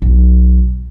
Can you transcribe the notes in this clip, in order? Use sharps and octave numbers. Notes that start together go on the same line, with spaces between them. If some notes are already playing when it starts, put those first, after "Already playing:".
B1 E2